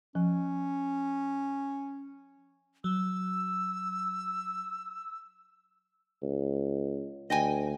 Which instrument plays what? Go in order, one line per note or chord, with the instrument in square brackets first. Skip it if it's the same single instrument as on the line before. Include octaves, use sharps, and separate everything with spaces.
[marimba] F3 [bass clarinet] C#4
[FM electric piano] F#3 [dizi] E6
[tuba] C#2
[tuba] D2 [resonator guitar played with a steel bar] D#5 G5 G#5